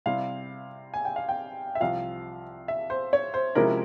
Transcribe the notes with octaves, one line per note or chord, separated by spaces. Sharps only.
C3 G3 C4 E4 F5
G#5
G5
F5
G5
E5
C2 C3 F3 F5
E5
C5
C#5
C5
C3 F3 G#3 C#4 E4 A#4